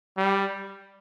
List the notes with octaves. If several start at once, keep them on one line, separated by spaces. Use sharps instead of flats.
G3